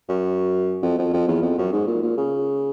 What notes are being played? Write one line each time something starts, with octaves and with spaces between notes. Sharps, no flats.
F#2
F2
F2
F2
E2
F2
F#2
G#2
A#2
A#2
C#3